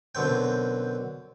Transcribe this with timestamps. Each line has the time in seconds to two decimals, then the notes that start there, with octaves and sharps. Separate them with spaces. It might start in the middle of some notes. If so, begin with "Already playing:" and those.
0.15 F#2 B2 D3 C4 G5